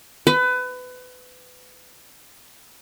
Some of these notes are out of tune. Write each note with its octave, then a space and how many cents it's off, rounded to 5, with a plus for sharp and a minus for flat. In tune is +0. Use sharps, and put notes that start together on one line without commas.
B4 +25